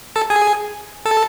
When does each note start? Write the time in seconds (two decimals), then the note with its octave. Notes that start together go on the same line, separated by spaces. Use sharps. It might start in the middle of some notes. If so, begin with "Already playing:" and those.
0.16 A4 A5
0.30 G#4 G#5
1.05 A4 A5